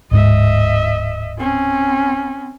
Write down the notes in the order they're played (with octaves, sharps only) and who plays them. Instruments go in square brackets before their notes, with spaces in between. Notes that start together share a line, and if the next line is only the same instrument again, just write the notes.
[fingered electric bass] D1 G#2 G#3 [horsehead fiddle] D#5 E5
[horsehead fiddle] C4 C#4